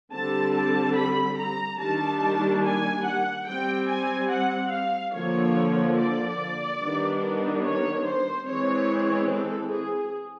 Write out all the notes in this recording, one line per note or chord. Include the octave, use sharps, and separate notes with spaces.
D3 G3 C4 A5
A5
B5
A#5
D#3 G3 A#3 D4 A5
G#5
F#5
G3 C4 G5
G#5
F#5
F5
D3 F3 A#3 C#5
D5
D#3 G3 B3 D4
C#5
C5
E3 G#3 C4 C#5
A4
G#4